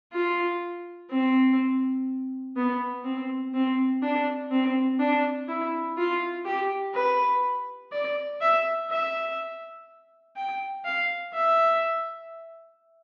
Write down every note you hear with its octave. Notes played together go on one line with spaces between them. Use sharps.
F4
C4
B3
C4
C4
D4
C4
D4
E4
F4
G4
B4
D5
E5
E5
G5
F5
E5